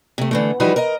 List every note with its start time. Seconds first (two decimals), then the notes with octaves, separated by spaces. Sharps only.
0.18 C3 A3
0.31 D3 E3 A3
0.60 E3 F3 G3 D#4 F#4 B4
0.76 A#4 D#5